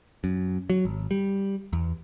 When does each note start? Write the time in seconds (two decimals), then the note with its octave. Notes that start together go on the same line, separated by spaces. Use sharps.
0.24 F#2
0.70 F#3
0.85 G#1
1.11 G3
1.73 E2